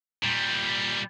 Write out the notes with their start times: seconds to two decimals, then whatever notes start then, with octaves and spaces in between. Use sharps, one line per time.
0.23 A#2 G3